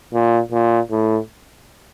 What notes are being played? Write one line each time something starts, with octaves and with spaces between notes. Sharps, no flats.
A#2
A#2
A2